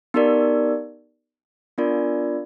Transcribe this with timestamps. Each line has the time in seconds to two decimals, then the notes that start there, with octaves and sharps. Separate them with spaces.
0.14 B3 D#4 G4 A#4 D5
1.78 B3 D4 F4 A#4 D5